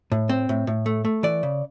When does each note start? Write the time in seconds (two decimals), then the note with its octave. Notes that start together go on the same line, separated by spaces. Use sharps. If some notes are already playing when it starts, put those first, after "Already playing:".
0.12 A2
0.29 C4
0.49 A2
0.67 A2
0.86 A3
1.05 A3
1.23 E3 D5
1.43 C#3